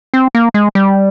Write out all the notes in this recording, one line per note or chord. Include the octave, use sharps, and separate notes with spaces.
C4
A#3
G#3
G3